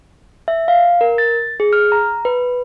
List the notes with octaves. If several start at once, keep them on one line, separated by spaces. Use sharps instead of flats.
E5
F5
A#4
A6
G#4
F6
A#5
B4